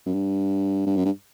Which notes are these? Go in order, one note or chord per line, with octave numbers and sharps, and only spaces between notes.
F#2
G2
G2
F#2
G2